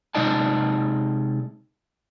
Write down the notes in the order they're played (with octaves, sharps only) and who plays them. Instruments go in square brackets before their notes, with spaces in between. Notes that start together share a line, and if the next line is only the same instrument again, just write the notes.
[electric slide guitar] C3 G#3 D#4 D5 D#5 A5